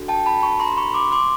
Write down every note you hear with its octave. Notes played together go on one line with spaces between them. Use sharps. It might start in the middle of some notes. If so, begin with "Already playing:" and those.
Already playing: D4 F#4 A4
G5 A5
A5 B5
B5 C#6
A#5 C6
B5 C#6
C6 D6
C6 D6